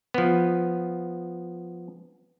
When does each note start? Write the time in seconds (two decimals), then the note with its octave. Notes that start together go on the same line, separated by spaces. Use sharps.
0.14 F3 B3